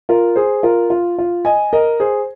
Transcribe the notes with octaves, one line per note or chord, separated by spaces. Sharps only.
F4 A#4
G#4 C5
F4 A#4
F4
F4
D#5 G#5
A#4 D#5
G#4 C5